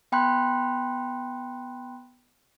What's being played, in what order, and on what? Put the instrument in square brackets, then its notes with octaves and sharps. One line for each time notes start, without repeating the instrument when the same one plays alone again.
[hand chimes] B3 G5 B5 C6 F#6